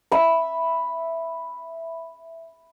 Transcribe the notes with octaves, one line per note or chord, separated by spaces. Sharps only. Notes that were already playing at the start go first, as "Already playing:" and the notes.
E5 B5